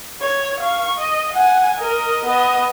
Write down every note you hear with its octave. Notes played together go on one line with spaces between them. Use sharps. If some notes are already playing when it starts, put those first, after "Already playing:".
C#5
F5 C#6
D#5
F#5 G#5
A#4 D#5
B3 D#5